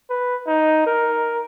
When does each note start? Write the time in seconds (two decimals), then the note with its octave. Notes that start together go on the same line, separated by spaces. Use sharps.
0.10 B4
0.47 D#4
0.87 A#4